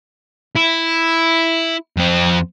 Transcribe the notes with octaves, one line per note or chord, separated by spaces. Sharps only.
E4
F2 C4